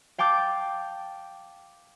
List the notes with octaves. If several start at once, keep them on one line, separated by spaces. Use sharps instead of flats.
F5 G5 A5 D6 G6